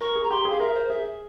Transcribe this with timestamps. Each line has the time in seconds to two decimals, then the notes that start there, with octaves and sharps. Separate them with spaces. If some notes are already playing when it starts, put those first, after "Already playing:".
0.01 A#4 C#6
0.16 G#4
0.24 A#5
0.31 G4 C6
0.45 G#4
0.50 F5
0.60 A#4 E5
0.74 C5
0.89 G#4 E5